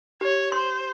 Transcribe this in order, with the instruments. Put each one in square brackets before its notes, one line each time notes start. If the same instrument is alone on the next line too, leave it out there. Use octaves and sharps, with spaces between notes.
[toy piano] G4 [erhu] C#5
[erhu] C5 [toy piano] C6